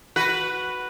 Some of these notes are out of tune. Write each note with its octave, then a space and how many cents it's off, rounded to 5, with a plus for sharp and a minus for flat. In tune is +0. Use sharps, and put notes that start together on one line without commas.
F#4 +0 B4 +0